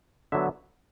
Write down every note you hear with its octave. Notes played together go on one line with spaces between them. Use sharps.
D3 F#3 B3 E5